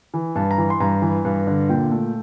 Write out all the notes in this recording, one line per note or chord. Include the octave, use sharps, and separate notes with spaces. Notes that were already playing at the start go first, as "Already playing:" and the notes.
E3
G2 A5
A#5
E3
C6
G2 A#5
E3
G2
D3
A#2 G5
A3